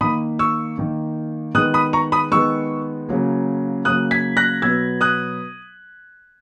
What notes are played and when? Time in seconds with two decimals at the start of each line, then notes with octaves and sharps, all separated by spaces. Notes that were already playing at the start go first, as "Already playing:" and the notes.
0.01 D#3 A#3 B5 D#6
0.39 C#6 E6
0.78 D#3 A#3
1.55 D#3 G#3 B3 D#6 F#6
1.74 B5 D#6
1.93 A#5 C#6
2.12 B5 D#6
2.32 D#3 G#3 B3 C#6 E6
3.09 C#3 F#3 A#3
3.85 C#3 F#3 A#3 D#6 F#6
4.11 G#6 B6
4.37 F#6 A#6
4.62 B2 F#3 B3 E6 G#6
5.01 D#6 F#6